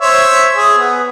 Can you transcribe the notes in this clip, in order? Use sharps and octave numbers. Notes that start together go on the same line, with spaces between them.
C5 C#5 E5
G#4
B3